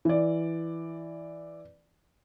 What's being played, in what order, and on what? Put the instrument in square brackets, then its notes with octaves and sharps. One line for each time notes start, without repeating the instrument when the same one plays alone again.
[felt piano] E3 D5